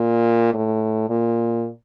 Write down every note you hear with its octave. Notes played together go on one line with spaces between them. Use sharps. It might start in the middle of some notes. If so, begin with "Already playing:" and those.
Already playing: A#2
A2
A#2